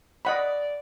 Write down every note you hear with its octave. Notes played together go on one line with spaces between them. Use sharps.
D5 D#5 F#5 B5